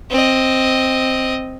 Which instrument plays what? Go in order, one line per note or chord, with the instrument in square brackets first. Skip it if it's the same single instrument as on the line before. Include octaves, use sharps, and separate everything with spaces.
[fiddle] C4 D#5